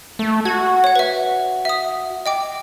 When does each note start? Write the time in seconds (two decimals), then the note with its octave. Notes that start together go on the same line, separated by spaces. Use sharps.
0.19 A3
0.45 F#4 G#6
0.84 C#5 F#5
0.96 B4 E5
1.65 E5 D#6
2.26 D#5 G5 D6